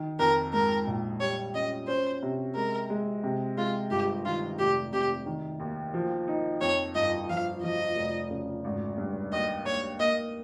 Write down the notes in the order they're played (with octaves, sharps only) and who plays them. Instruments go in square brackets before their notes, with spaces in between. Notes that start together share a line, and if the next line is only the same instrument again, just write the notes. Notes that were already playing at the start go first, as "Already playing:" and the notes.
Already playing: [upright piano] D#3
[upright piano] F2 [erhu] A#4
[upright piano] G#2 [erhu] A#4
[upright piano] A#1
[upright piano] G3 [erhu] C#5
[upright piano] C#4 [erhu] D#5
[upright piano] C#4 [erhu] C5
[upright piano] C3
[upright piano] G#3 [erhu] A#4
[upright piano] G#3
C3
[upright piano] G#3 [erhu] F4
[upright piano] G1 [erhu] G4
[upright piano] D#3 [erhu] F4
[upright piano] F1 [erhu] G4
[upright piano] C3 [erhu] G4
[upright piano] D#3
D#2
F3
D#4
[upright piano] F2 [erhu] C#5
[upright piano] G1 [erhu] D#5
[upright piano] F3 [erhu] F5
[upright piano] F3 [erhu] D#5
[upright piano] F1
C#3
G#1
G2
[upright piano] D#2 [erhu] D#5
[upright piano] D#2 [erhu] C#5
[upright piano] A#3 [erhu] D#5